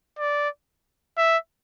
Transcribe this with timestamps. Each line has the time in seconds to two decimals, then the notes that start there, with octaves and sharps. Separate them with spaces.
0.19 D5
1.18 E5